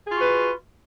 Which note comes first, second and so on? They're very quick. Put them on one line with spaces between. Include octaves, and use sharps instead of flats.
G#4 F4 F#4 B4